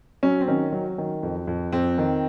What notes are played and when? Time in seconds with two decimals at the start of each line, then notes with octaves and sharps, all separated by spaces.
0.23 F#3 C#4
0.41 C4
0.48 D#3 C#4
0.72 F#3
0.98 D#3
1.23 F2
1.47 F2
1.72 F2 C4
1.98 D#3